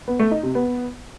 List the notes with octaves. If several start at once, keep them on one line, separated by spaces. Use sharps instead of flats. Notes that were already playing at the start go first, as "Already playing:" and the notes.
B3
A3
D#4
C3
B3